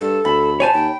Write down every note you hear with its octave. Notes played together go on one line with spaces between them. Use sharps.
G2 A4
D2 B5
C5 C#5 G#5 A5
D#2 G5